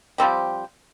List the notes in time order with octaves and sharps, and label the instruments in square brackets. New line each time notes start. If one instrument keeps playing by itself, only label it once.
[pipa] F3 G3 C4 G4